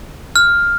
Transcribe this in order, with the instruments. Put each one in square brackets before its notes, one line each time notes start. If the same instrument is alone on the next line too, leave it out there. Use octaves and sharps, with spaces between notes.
[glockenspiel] F6